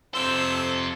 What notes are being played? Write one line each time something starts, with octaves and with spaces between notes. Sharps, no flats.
F2 C3 A4 C5 G5 E6